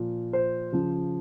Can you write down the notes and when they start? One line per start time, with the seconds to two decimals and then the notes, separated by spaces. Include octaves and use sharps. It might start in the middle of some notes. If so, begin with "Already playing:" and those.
Already playing: A#2 F3
0.33 C5
0.72 C#3 F3